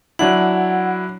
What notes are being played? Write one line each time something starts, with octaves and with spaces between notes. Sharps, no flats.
F#3 D4 E4 F#5